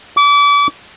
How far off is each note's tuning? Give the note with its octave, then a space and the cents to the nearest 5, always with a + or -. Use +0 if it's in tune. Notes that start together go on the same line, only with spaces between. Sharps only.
D6 -35